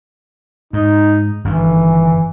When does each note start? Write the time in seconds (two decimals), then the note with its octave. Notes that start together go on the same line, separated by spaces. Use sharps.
0.73 G#2 D#4
1.45 G1 G2 D#3 E3